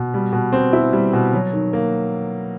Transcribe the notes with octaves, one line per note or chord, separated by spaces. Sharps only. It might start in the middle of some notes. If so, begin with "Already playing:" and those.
Already playing: B2
G3
B2
C4
E4
G3
B2
F#3
D#3
A#3